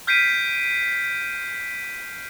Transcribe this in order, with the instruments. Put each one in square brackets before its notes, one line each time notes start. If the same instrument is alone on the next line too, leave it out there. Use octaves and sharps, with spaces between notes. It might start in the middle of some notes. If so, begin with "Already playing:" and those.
[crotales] F6 G6 B6 C7 D7 D#7